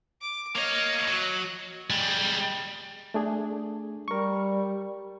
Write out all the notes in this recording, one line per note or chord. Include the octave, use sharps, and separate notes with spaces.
D6
A#3 C#5 D#5 F5
F#3
G3 G#3
A3 D4 G#4
G3 A#4 C#6